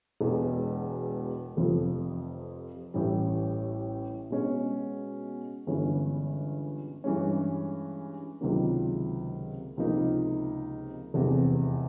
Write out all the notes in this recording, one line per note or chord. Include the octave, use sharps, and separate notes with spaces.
E1 E2 B2 G#3
F1 F2 C3 F3
A1 A2 E3 G3
B2 G#3 C#4
G1 G2 E3 G#3 C#4
G2 E3 G#3 C#4
C#2 C3 D#3 F#3 A#3
C#2 C3 F3 A#3 D#4
F1 E2 C3 E3